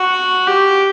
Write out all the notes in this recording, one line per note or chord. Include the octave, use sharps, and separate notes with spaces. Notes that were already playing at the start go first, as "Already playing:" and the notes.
Already playing: F#4
G4